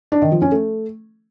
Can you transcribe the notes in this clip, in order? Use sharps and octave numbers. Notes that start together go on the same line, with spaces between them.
D4
D#3
F3
C#4
A3